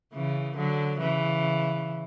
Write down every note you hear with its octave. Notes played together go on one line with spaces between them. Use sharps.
C#3 E3
D3 F#3
C#3 E3